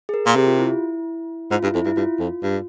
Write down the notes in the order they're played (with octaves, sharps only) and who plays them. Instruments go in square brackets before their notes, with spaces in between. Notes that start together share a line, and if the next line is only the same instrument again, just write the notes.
[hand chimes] G#4
A#4
[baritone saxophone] A#2 [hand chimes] A#4
[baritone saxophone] C3 [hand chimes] G4
[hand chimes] F4
E4
[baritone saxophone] G#2 [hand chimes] F4
[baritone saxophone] G2 [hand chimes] E4
[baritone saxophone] F2 [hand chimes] E4
[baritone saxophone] G2 [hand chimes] E4
[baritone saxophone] G2 [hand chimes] F4
[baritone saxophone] F2
G2